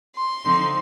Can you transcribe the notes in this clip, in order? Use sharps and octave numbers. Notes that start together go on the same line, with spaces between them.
C6
D3 F3 C4 D#4